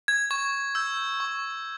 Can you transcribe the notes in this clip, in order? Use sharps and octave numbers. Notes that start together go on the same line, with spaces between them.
G#6
C#6 G#6
E6 G6
C#6